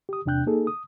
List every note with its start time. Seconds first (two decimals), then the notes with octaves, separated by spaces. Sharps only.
0.09 G4 D#6
0.26 E2 C3 D4 G5 F#6 G6
0.46 A#3 D#4 G#4 A4
0.67 D#6